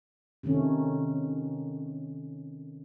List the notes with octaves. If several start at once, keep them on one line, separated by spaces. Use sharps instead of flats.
C3 D#3 A3 C#4